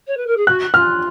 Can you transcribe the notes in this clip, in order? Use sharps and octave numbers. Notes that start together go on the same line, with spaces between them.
C#5
B4
A#4
G#4
F#4 F#6
F4 F6